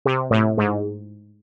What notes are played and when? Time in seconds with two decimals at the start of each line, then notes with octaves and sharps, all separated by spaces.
0.05 C3
0.30 A2
0.57 G#2